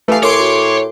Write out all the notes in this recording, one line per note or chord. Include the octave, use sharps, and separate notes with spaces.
E3 A3 G4 A4 F5 G#5
A2 A#4 C#5 C6 D6
F#4